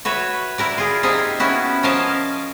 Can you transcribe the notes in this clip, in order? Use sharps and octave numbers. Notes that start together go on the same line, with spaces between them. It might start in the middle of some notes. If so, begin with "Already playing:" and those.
F#4 B4 C#5 E5
E4 A#4 D5
F4 G#4
A#3 C4 D#4 G4 G#4
B3 C#4 E4 F#4
F3 C#4 A#4 D#5 F5 A5